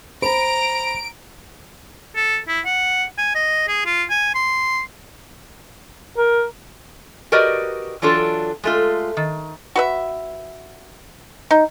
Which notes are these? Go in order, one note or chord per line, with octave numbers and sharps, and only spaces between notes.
C5 A#5 B5 D7
A4
E4
F#5
G#5
D#5
G#4
F4
G#5
C6
A#4
F#4 G4 A#4 B4 D5 D#5
E3 F#3 D4 F4 A4
G#3 A3 F4
D#3
F#4 B4 E5
D#4